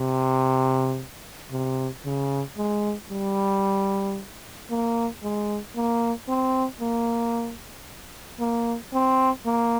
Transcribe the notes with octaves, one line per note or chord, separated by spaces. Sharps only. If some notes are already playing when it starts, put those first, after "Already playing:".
Already playing: C3
C3
C#3
G#3
G3
A#3
G#3
A#3
C4
A#3
A#3
C4
A#3